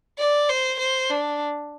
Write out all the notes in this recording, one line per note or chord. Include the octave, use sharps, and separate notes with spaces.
D5
C5
C5
D4